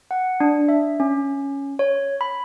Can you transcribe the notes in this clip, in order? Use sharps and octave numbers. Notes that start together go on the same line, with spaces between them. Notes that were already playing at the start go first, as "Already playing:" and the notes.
F#5
D4
E5
C#4
C#5
B5